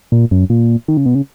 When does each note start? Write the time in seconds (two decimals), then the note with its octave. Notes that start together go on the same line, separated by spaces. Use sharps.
0.12 A#2
0.31 F#2
0.50 A#2
0.88 D#3
0.97 C#3
1.06 B2
1.15 C#3